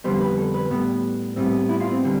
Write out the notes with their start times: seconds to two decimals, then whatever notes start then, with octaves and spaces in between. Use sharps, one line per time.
0.04 F2 D3 G3 B3 C5
0.21 B4
0.38 A4
0.54 B4
0.70 A2 G3 B3 B4
1.36 A2 G3 B3 C4
1.69 E4
1.80 F4
1.92 C4
2.04 D3 G3